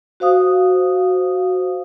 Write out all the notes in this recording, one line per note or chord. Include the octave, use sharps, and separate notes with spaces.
F#4 C5 F5 D#6